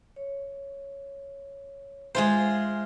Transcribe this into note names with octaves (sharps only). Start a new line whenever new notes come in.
C#5
G#3 F4 C5 E5 F5 G#5